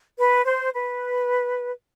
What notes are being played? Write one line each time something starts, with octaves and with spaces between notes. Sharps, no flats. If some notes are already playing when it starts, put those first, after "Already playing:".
B4
C5
B4